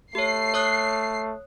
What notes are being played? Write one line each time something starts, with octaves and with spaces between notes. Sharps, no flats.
A3 G4 C#5 C7
C#5 D#6 F#6